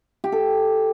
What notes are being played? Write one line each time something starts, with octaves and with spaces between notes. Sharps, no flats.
G4
A4